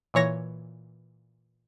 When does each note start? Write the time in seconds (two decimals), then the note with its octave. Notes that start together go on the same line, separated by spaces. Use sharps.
0.14 A#2 E3 C#5 A#6